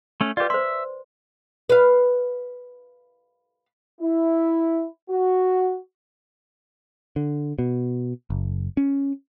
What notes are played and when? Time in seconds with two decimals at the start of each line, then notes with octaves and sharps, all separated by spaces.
0.21 A3 C#4
0.37 F4 G4 B4 D5
0.50 C5 E5 C6
1.69 B4 F5
4.01 E4
5.10 F#4
7.16 D3
7.59 B2
8.30 F#1
8.77 C#4